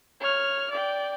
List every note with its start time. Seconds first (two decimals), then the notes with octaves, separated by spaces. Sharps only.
0.21 C#5 F6
0.70 D5 G5